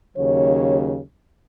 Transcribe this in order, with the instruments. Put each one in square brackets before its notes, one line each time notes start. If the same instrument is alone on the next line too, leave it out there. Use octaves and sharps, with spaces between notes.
[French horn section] D#2 C#3 F#3 C#5